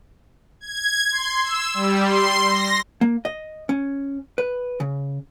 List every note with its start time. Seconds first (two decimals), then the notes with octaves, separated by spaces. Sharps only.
0.60 G#6
1.11 C6
1.43 E6
1.74 G3
2.04 C6
2.49 A#6
3.01 A#3
3.25 D#5
3.69 C#4
4.38 B4
4.80 C#3